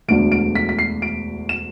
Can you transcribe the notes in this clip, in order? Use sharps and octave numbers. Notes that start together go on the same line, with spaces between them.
E1 D2 D3 A3 D7
D7
B6
B6
C7
D7
E7